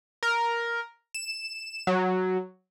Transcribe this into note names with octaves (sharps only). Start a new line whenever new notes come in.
A#4
E7
F#3